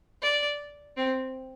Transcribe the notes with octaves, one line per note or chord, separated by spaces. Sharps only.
D5
C4